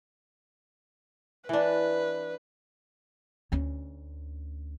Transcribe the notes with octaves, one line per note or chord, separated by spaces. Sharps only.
E3 D4 B4
D2 C#4